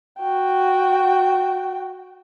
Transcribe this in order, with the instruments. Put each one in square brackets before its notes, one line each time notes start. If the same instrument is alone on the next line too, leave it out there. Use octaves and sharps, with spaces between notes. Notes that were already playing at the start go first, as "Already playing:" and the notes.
[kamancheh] F#4 G5